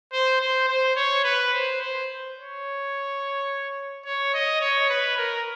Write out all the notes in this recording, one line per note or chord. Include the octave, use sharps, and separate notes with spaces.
C5
C5
C5
C#5
B4
C5
C5
C#5
C#5
D#5
C#5
B4
A#4